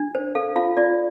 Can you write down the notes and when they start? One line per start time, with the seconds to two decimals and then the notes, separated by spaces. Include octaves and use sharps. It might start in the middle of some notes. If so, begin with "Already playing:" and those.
Already playing: D4
0.15 C5
0.35 A4 F5
0.56 F4 F5
0.77 F4 D5